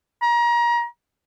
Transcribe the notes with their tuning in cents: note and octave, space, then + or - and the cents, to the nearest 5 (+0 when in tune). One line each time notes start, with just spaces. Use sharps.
A#5 +30